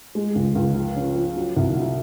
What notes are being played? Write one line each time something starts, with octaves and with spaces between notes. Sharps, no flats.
G#3
C#2
C#2
F3
C#4
F3
F#3
C2
F#3